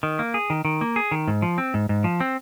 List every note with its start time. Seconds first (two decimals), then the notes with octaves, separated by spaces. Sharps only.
0.03 D#3
0.19 A#3
0.34 G#4
0.50 D#3
0.65 D#3
0.81 A#3
0.96 G#4
1.11 D#3
1.28 G#2
1.42 F3
1.58 C4
1.74 G#2
1.89 G#2
2.04 F3
2.20 C4